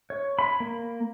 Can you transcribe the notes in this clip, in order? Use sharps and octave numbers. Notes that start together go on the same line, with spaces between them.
C#5
B5
A#3